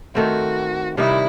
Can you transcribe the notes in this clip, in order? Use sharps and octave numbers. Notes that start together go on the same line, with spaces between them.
D#3 A3 C4 F#4
C3 D#3 G3 D#4 E4